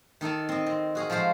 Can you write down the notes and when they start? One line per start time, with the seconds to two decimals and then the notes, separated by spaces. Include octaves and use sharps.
0.21 D#3 D#4 A4 A5
0.49 C4 D#5
0.66 C4
0.95 F#4 G#4 F5
1.10 F3 G#3 A3 C5 F5